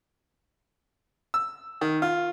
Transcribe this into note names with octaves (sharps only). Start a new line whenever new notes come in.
E6
D#3
F4